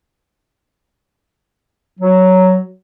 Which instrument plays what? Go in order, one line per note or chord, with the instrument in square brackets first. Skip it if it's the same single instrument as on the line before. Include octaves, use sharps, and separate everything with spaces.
[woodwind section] F#3